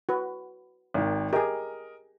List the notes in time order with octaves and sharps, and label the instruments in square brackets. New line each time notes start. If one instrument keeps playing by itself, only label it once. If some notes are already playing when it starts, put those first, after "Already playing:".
[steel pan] F#4 B4
[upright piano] G#1 D#3
[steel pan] G4 G#4 [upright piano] A#4 D#5